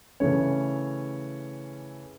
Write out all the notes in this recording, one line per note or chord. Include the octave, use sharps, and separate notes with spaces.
C#3 E3 A3 C#4 C#5